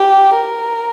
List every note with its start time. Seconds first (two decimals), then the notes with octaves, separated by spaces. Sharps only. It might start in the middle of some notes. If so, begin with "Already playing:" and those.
Already playing: G4
0.35 A#4